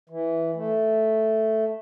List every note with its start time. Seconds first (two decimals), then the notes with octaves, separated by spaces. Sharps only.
0.09 E3
0.56 A3